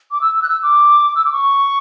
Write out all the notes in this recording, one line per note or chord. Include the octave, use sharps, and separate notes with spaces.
D6
E6
E6
F#6
E6
D6
E6
D6
C#6